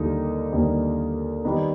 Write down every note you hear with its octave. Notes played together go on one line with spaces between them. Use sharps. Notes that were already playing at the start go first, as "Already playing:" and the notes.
Already playing: D#2 D3 G3 A#3 D#4
D#2 D3 G3 A#3 D#4
D#3 G3 B3 D#4